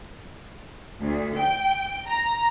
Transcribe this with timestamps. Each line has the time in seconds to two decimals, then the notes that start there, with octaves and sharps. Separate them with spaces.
0.99 D2
1.37 G5
2.07 A#5